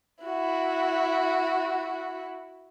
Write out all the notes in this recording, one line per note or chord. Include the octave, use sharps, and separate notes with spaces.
E4 F#4